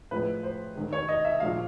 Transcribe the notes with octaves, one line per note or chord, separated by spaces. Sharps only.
A2 F3 G#3 B4
C5
G#2 D#3 G#3
C#5
D#5
E5
A#2 F3 G#3 F5